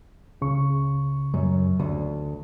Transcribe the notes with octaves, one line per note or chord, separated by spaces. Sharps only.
C#2 C#3 C#6
F#2
D2